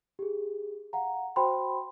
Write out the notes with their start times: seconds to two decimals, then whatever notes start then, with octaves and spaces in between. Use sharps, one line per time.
0.19 G4 G#4
0.93 F5 F#5 A#5
1.36 F#4 C5 G5 B5 C6